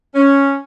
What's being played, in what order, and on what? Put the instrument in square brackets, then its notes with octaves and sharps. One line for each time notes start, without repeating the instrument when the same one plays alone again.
[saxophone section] C#4